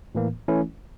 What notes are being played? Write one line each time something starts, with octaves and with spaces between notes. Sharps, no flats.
A2 E3 A#3
E3 A3 C#4 E4